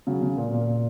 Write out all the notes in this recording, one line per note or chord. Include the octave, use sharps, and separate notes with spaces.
C#3 F#3
C#3
A#2
A#2